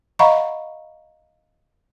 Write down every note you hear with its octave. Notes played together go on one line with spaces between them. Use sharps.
D#5 F5 F#5 A#5 B5 C#6